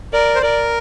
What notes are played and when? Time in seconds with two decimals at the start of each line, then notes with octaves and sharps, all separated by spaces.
0.13 A#4 D5
0.35 C5
0.42 A#4 D5